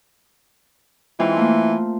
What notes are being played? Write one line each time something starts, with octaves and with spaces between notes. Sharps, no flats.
G#2 E3 C4 F4
A3 A#3